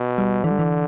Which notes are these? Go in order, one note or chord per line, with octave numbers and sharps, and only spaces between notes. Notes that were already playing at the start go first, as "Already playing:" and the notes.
Already playing: B2
G3
D3 E3
G3
E3